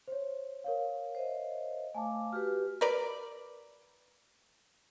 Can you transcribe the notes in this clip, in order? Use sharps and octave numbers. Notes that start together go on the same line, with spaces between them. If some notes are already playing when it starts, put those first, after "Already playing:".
C5 C#5
A#4 C#5 F5
C5 D#5 E5
A3 F5 G#5 A5 D6
F#4 G4 B4 F6
A#4 B4 D5